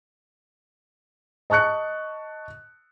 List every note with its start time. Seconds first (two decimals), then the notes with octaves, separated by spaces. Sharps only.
1.50 D#5 A5 C#6 F#6 C#7